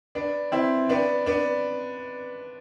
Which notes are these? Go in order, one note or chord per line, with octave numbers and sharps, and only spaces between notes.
B3 D4
C4 E4
B3 D4
B3 D4